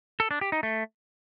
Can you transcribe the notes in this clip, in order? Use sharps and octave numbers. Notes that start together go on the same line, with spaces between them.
A4
D4
G4
D#4
A3